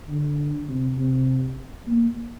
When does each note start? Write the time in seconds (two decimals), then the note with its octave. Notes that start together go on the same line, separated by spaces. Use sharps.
0.09 D3
0.69 C3
0.98 C3
1.87 A#3